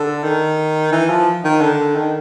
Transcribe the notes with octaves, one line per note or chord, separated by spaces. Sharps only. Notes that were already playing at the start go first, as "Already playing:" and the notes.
Already playing: D3
D#3
E3
F3
D#3
D3
D#3